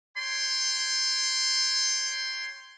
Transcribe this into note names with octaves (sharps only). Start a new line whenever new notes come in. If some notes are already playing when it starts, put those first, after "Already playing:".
C#5 G5 C6